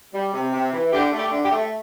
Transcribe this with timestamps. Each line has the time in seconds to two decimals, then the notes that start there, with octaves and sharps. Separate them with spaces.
0.14 G3
0.34 C3
0.53 C3
0.73 E3
0.92 D3 G4
1.13 A3
1.19 G4
1.31 D3
1.45 G4
1.51 A3